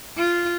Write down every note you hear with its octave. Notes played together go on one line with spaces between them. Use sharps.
F4